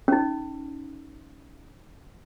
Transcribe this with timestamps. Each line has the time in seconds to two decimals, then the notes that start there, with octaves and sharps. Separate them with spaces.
0.08 C#4 D#4